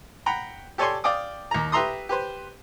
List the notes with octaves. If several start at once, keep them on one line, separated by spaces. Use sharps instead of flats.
F#5 G5 A#5 B5
G4 A4 C#5 D5 G#5 C6
D5 F5 G5 D6 D#6
D#2 A#5
G4 B4 E5 A#5 C6 D#6
G4 B4 C5